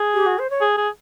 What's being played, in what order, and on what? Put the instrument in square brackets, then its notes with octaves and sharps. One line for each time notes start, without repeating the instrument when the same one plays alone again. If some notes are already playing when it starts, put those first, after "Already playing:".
Already playing: [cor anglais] G#4
[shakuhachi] G4
F#4
C5
C#5
[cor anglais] G#4
G#4